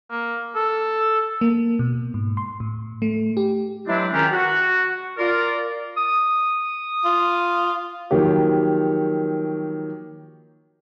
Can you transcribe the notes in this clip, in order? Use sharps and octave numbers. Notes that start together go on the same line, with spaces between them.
A#3
A4
A#3
B2
G#2
C6
A2
A3
G4
E3 F#3 G#3 C4 D4 E4
C#2 D#3 C#4 F4 G4 A#5
F#4
F4 A#4 D5
D#6
F4
D#3 F3 F#3 A#3 G4 C#5